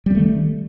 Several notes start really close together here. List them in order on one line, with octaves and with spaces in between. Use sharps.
G3 C4 A3 D#3